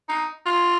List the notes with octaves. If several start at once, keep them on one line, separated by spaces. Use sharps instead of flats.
D#4
F4